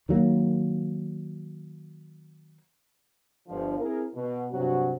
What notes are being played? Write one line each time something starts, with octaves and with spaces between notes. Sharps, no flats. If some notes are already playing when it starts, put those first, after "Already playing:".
D#3 F#3 A#3
G1 D3 F3
C4 E4 G#4 A#4
B2
G2 C3 F#3 C#4 F#4